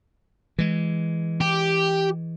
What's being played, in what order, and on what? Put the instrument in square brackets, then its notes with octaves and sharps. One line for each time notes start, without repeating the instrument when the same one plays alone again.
[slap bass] E3 G#3
[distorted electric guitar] G4